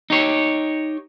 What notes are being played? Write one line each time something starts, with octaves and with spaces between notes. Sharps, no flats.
D#4 G4 C#5